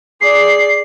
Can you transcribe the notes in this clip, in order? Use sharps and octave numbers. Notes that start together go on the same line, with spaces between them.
G#4 D5 C7